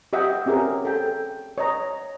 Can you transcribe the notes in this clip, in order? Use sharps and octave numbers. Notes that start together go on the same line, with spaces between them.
G4 D#5 E5 F#5 G5
C4 C#4 G4 G#4 A#4
A4 G5
C#5 D#5 A#5